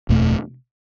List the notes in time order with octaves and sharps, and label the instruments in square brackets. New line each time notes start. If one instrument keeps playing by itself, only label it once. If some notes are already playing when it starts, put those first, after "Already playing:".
[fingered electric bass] F#1 E2 B2 A3